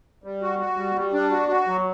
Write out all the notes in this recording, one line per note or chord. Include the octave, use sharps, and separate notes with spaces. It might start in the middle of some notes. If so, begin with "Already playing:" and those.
G3
F#4
F#4
G3
G3
D4
F#4
F#4
F#3